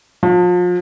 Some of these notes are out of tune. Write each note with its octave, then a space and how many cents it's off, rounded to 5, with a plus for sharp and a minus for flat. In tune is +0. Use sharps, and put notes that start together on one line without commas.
F3 +35